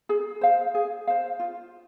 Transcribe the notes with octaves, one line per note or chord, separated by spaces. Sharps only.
G#4
C5 F5
G#4
C5 F5
F4